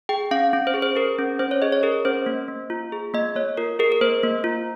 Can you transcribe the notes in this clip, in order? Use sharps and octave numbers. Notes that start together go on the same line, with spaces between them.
G#4 G5
C#4 F5
C#4
C5
G#4
C5
G#4 A#4
C#4
C#4 C5
C#5
G#4 D#5
C#5
G#4 A#4
C#4 C5
A#3
A#3
F4
G#4
A#3 D#5
A#3 C#5
F4 A#4
G#4 A#4
A#4
A#3 C5
A#3
F4